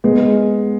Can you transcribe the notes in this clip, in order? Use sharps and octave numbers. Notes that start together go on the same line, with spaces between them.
G#3 B3